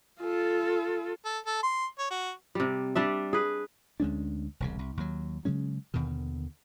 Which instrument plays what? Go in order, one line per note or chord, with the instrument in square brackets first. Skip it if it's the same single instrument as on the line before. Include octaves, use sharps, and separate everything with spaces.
[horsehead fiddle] F4 A4
[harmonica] A4
A4
C6
C#5
F#4
[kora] C3 G3
G3 D4 E5
G#4 B4
[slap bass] D2 G#3 C#4 D4
E1 C2 C#3
C2
D#2 F#3
C#3 F#3 G#3 C#4
D#2 B2 D3 D#3